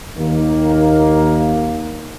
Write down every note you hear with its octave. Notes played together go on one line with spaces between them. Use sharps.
D#2 D#3 A#3